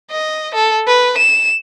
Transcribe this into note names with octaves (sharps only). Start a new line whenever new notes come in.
D#5
A4
B4
E7